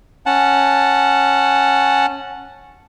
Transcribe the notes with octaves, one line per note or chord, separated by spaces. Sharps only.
C#4 F#5 A5